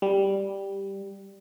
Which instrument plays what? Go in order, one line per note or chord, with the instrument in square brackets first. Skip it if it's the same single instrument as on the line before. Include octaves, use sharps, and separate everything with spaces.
[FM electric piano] G3